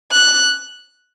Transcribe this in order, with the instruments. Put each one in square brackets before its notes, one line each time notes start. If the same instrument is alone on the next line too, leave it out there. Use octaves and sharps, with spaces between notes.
[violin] F#6